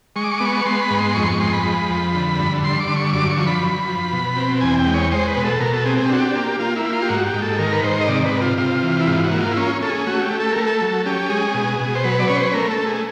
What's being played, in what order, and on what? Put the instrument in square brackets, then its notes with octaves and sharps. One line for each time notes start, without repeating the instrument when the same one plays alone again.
[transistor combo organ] G#3 C#6
D6
C#6
B3 D6
C#6
G#3 C6
B5
G#2
C6
F2 C#6
C6
C#6
G#3 C6
B5
F3
F2
D3
G2
G2 C6
D6
D3
C#6
F#2 D6
C#6
F3
B5
F#2
F3
B2
C4
E2 G#5
G5
G#3
C#5
G#3 C5
B4
B2
A4
B2 A#4
A4
C4 G#4
G#4
G4
D4 F#4
G4
A#3
A#3 F4
E4
A#3
F4
G4
G#2 F#4
G4
G#2
A4
D#3 A#4
B4
G#2 C5
D#5
C3 D5
B4
C3
F4
C3 F4
E3
E4
G#2 F4
F#4
A#3
F4
E4
C#4 F4
C#4 A4
G#4
A3 F#4
G4
A3
A4
A3 A#4
A4
F#3
C#4 G4
G#3 G#4
B2
B2
C5
F#3 B4
D5
C#4 C#5
C5
B4
A3 A#4
A4
A3
G#4